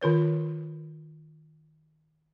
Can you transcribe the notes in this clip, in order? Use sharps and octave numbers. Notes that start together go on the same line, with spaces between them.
D#3 F4 B4 C#5